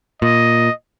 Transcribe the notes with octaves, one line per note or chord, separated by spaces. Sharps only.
A#2 D#5